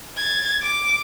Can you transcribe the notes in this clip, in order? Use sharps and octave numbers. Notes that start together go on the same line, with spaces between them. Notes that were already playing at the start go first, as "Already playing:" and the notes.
G#6 A6
D6